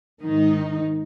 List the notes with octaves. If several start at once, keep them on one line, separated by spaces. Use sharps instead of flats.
G#2 D#3 D#4